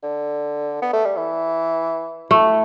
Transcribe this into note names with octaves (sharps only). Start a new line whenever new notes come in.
D3
B3
A3
G3
E3
A3 E4